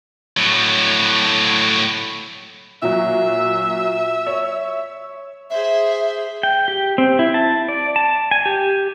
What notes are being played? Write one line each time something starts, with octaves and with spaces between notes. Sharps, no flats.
A2 F#3
A#2 F#3 E5
C#5
G#4 C5 E5
G5
G4
C4
E4
A5
D5
A5
G#5
G4